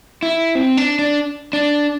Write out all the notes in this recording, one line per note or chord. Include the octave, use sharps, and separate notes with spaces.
E4
C4
D4
D4
D4